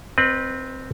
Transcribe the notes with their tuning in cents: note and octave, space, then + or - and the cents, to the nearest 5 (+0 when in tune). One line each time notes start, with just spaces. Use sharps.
C4 +0 B4 -25 D#5 -25